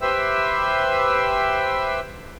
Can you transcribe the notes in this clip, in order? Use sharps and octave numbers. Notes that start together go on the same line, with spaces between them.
G4 B4 C5 E5 G5 E6